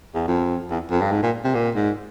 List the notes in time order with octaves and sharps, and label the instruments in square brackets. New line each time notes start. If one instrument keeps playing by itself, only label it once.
[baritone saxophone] E2
F2
E2
F2
G2
G#2
A#2
C3
A#2
G#2